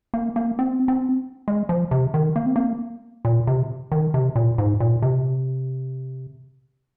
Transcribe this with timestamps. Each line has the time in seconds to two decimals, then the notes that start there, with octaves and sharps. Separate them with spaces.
0.14 A#3
0.36 A#3
0.59 C4
0.88 C4
1.48 G#3
1.69 F3
1.91 C3
2.14 D#3
2.36 A#3
2.46 C4
2.56 A#3
3.25 A#2
3.47 C3
3.92 D#3
4.14 C3
4.36 A#2
4.58 G#2
4.80 A#2
5.02 C3